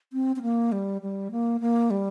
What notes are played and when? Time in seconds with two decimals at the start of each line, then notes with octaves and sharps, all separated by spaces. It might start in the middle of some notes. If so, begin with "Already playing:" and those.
0.13 C4
0.36 C4
0.42 A#3
0.72 G3
1.02 G3
1.31 A#3
1.61 A#3
1.91 G3